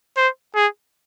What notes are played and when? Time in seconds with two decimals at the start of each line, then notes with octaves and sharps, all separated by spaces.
0.17 C5
0.55 G#4